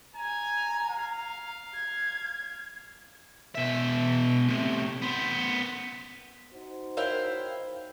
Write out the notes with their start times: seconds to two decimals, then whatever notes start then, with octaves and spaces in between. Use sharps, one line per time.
0.16 G#5 A#5
0.90 F5
1.74 G#6
3.55 B2 E5
4.49 A2 C3
5.01 B3 C5
6.53 D#4 F#4 C5
6.97 E4 A#4 C#5 D#5 F5 G5